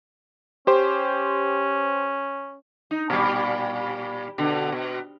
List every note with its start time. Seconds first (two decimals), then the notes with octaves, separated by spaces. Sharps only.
0.67 C#4 G4 C5
2.91 D#4
3.10 A#2 G3
4.38 B2 D3
4.72 B2